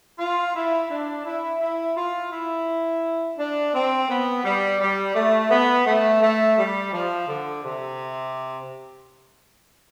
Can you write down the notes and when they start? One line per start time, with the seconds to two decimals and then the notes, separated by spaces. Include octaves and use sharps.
0.19 F4
0.54 E4
0.89 D4
1.24 E4
1.60 E4
1.96 F4
2.31 E4
3.37 D4
3.73 C4
4.08 B3
4.43 G3
4.80 G3
5.15 A3
5.50 B3
5.85 A3
6.21 A3
6.57 G3
6.92 F3
7.27 D3
7.63 C3